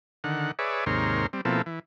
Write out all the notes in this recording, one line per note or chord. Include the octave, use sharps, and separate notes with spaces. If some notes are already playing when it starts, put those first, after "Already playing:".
D3 D#3 F#5
G#4 B4 C#5 D5 E5
D#2 G#2 C3 A#4 C#5 C6
G3 C4
B2 F3 A#3 C4 E4 A4
E3